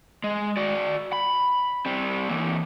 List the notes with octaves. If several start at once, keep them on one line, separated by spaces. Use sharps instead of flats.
G#3
F#4 D5
B5
G3 C4
E3 A#3